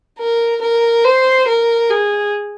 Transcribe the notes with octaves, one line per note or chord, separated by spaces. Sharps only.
A#4
A#4
C5
A#4
G#4